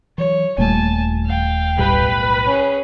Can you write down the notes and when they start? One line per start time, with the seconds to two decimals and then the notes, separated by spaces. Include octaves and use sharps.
0.18 E3 F#3 C#5
0.58 D#1 A#2 G3 A3 A#3 G#5 A5
1.26 F5 G5
1.78 B1 A2 G3 B4 B5
2.46 C#4 G#4